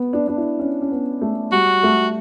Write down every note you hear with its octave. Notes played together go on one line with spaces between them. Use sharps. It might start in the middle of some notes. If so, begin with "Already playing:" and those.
Already playing: B3
D4
D4
E4
C#4
C#4
B3
A3
G3 F#4
A3